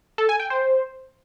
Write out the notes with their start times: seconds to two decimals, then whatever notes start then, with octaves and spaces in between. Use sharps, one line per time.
0.18 A4
0.29 G#5
0.40 G5
0.50 C5